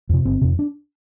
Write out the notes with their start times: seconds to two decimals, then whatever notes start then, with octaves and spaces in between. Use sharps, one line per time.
0.09 F2 C3
0.25 G1 C4
0.41 F2 C3
0.59 D4